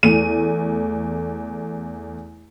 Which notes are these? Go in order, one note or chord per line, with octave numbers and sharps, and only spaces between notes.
E2 A3 D#7